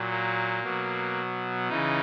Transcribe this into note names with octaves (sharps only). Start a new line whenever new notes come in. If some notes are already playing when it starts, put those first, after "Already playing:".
Already playing: A#2 F#3
A#3
B2 F#3
C#3 E3 D#4